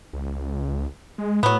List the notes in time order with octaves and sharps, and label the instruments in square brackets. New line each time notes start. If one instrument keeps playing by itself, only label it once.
[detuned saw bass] C#2
G#3
[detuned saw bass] A2 [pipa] F#3 B3